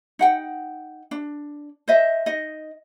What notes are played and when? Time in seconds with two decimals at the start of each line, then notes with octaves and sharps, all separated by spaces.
0.19 D#4 F#5 G5
1.11 D4
1.88 C5 D#5 E5
2.26 D#4 D#5